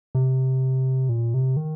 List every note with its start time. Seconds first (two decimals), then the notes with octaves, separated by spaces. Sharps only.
0.15 C3
1.09 A#2
1.34 C3
1.57 D#3